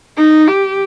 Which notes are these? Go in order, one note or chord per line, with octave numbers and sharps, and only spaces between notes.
D#4
G4